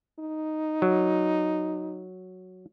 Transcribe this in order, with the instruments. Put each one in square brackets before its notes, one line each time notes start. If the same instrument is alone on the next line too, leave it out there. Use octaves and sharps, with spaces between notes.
[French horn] D#4
[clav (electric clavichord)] F#3